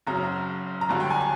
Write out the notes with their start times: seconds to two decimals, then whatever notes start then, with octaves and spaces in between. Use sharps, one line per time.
0.07 F#1 F#2 C#3 F#3 A#5
0.81 A#5
0.89 G1 G2 D3 F#3 A5
1.00 G5
1.10 G#5
1.20 A5